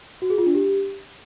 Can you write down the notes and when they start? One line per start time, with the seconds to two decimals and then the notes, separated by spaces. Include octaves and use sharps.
0.22 F#4
0.30 G#4
0.38 F4
0.46 D4
0.55 G4